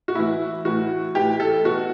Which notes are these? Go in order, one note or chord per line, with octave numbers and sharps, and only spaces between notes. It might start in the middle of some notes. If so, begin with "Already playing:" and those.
F#4
A2 E3 E4
A2 E3 F#4
A2 E3 G4
A4
B2 F#4